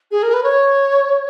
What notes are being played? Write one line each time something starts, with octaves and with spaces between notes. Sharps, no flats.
G#4
A#4
B4
C#5